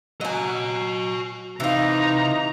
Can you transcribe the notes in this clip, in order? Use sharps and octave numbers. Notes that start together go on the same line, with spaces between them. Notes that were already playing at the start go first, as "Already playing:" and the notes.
F#3 F#4 D#5 G#5
C3 E3 D#4 F4 A#5